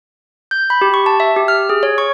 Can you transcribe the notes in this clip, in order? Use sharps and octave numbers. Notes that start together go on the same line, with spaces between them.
G6
B5
G4
C#6
A5
E5
G4
F6
G#4
C#5
C#6